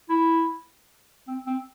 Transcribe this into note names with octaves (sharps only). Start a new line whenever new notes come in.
E4
C4
C4